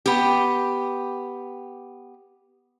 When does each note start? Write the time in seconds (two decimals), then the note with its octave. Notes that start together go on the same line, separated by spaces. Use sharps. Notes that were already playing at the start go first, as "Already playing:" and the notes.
0.06 B3 G4